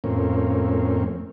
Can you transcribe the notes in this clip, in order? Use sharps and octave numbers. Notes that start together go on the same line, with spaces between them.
F2 A2 A#3 C4 C#4